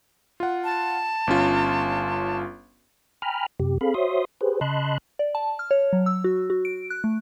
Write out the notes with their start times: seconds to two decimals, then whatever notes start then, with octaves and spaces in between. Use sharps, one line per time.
0.40 F4 F#5
0.64 A5
1.27 G1 C#4 F4
3.22 G5 G#5 A#5 B5 F6
3.60 F#2 C3 G4
3.81 C4 G#4 A4 F5 B5
3.94 F#4 C5 C#5 E5 C6 D#6
4.41 G4 G#4 B4 C5
4.61 C#3 D#5 A5 B5 C6 F#6
5.19 D5
5.35 A5
5.59 F6
5.71 C#5
5.93 F#3
6.06 E6
6.24 F#4
6.50 F#4
6.65 D7
6.90 F#6
7.04 A3